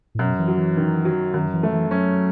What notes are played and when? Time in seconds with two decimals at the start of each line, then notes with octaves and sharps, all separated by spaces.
0.15 A2
0.19 F#2 B2
0.39 E3
0.48 F#3
0.57 E3
0.77 D#3
1.05 F#3
1.34 F#2 D#3
1.53 E3
1.63 A3
1.72 E3
1.91 F#3 C#4